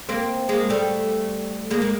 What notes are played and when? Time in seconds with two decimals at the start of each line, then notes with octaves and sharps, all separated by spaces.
0.09 A#3 C4
0.49 G#3 A#3
0.70 G3 A3
1.71 G#3 A#3
1.82 A#3